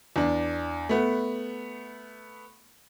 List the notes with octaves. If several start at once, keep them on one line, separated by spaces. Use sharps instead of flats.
E2 D4
A3 B3